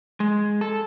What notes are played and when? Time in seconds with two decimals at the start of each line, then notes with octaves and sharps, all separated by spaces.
0.20 G#3
0.61 A4